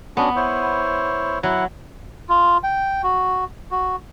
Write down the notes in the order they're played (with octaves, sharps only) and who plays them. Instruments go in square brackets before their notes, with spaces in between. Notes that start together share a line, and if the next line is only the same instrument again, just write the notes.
[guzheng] B3 [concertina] C#4 D4 F#4
[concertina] E4 C5 C#5
[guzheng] F#3 [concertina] E4 F#5
[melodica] F4
G5
F#4
F#4